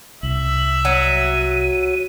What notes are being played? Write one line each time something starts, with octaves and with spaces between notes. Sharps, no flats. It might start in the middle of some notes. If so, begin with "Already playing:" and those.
C2 E5 F#7
F#3 D#7